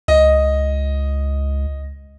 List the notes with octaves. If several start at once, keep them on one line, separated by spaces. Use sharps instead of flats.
C#2 D#5